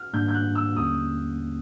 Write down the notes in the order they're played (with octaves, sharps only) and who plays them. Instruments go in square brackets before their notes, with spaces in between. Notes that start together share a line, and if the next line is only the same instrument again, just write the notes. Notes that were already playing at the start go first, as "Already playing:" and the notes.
Already playing: [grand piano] F6
[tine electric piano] G#2 D#3 G3 A#3 D4 [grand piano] G6
[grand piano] G6
F#6
E6
[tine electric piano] D#2 D3 G3 A#3 C#4 [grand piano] D#6